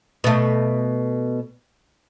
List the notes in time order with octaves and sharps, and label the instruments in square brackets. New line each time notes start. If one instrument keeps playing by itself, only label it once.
[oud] B2 A3